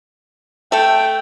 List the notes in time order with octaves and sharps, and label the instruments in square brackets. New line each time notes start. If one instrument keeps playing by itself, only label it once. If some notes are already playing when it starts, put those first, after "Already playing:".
[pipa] A3 A4 [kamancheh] G5